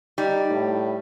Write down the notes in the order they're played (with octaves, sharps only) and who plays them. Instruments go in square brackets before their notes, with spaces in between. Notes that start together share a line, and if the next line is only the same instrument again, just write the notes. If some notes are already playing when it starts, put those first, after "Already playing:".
[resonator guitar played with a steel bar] G3 [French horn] D#4
[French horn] A2